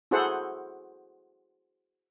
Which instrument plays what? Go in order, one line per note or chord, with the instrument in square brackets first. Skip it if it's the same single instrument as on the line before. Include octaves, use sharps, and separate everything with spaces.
[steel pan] E4 F#4 G#4 A4 C5 F#5